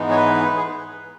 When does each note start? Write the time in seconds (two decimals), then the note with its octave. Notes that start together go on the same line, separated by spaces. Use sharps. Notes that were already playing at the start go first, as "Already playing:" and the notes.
Already playing: G#2 E3 G#3 B3 D#4
0.11 C#5
0.16 B4
0.57 G#4